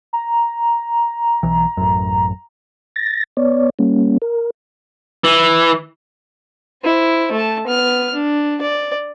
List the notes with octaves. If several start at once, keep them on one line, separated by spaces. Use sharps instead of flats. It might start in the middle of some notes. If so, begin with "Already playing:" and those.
A#5
B1 E3
A1 F#2
A6 A#6
B3 C#5 D5
G3 A#3 C#4
A#4
E3
E4 C5
A3 A5
B3 F6
D4
D5